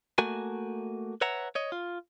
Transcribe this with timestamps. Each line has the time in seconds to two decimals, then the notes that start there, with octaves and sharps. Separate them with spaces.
0.18 A3 A#3 F#4 G#5
1.21 B4 C#5 E5 F#5 A#5
1.55 C#5 D#5
1.72 F4